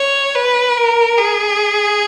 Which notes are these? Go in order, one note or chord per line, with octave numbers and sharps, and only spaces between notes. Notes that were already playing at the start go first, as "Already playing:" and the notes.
Already playing: C#5
B4
A#4
G#4